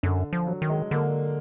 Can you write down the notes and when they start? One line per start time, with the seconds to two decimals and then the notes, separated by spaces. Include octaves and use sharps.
0.03 F#2 D3
0.33 F3
0.47 F#3
0.62 D#3
0.70 G#3
0.91 D3 A#3